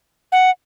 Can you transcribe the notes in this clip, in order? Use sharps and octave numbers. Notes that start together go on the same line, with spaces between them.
F#5